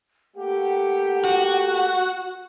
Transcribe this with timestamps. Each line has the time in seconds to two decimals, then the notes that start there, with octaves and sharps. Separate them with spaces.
0.36 A3 A#3 G4 F#5
1.24 F#4